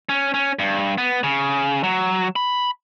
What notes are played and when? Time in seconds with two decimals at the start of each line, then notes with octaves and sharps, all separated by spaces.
0.09 C#4
0.34 C#4
0.59 G2
0.98 B3
1.24 C#3
1.84 F#3
2.36 B5